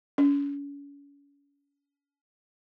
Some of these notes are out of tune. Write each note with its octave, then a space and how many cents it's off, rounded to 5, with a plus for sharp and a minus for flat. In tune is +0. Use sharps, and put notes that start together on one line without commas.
C#4 +35